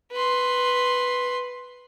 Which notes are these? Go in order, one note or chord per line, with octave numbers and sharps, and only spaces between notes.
B4 C6